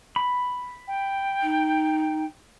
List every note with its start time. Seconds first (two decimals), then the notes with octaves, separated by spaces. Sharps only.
0.16 B5
0.88 G5
1.42 D#4